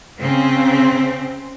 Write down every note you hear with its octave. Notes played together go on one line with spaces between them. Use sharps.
C#3 C4